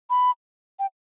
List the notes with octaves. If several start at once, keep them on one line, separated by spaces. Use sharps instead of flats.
B5
G5